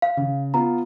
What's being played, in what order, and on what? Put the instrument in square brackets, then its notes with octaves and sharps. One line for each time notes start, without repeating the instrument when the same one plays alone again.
[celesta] F5
[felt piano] C#3
[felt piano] B3 F4 [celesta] A#5